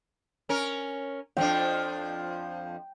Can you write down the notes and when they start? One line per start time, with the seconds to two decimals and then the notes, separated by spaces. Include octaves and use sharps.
0.49 C#4 A#4
1.37 F2 F3 D4 G5